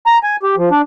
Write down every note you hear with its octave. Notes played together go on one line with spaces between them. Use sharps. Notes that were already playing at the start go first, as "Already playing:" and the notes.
A#5
G#5
G4
F3
D4